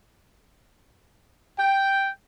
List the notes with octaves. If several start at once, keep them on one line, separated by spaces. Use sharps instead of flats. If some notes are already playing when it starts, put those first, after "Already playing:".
G5